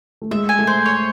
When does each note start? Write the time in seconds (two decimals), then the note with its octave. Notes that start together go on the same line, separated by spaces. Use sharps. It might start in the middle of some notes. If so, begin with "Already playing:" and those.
0.22 A3
0.31 G#3 E5
0.49 G#5
0.59 A3
0.67 C5
0.86 C#5